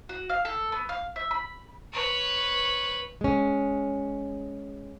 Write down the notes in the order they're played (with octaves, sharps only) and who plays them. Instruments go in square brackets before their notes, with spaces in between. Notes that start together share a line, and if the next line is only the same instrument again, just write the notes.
[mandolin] F#4
F5
A4
B3
F5
E5
B5
[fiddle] B4 C#5
[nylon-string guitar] G#3 C#4